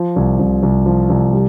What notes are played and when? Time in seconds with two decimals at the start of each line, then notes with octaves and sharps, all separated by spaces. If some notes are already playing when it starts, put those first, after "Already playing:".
Already playing: F3
0.16 C2
0.40 C2
0.63 C2
0.86 F3
1.10 C2
1.33 G3